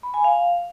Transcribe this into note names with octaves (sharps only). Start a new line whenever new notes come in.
B5
G#5
F5